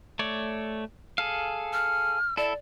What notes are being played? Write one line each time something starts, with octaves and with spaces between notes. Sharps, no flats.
A3 C#5 D5
G#4 A4 F5
F6
E4 A4 D5